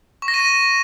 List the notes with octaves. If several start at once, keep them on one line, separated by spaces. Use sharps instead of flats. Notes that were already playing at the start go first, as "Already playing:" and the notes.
C#6
A#6
D#7
A#6